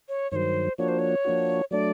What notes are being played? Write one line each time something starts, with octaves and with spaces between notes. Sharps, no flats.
C#5
G2 D#3 F#3 C5 C#5
F3 A#3 D4 F#4 C#5
C5
C#5
F3 A#3 D4 F#4
F#3 A3 D4 D5